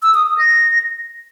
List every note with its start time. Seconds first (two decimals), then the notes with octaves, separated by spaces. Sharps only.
0.03 E6
0.15 D#6
0.26 D#6
0.38 A#6